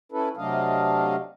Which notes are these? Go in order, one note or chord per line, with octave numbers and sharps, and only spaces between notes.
C#4 E4 A4 B4
C3 F#3 A3 D4 D#5 F5